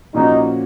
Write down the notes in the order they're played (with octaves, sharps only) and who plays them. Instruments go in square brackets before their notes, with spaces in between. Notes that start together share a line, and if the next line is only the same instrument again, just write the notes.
[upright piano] A#2 F3 A#3 C#4 F#4 [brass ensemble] D#4